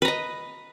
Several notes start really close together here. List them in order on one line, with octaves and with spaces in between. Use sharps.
B4 A#5 D#5